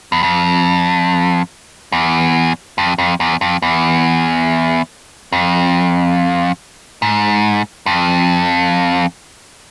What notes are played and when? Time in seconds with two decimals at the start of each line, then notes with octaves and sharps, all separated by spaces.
0.12 E2
0.23 F2
1.92 E2
2.78 F2
2.98 F2
3.20 E2
3.41 F2
3.62 E2
5.32 F2
7.02 G#2
7.86 F2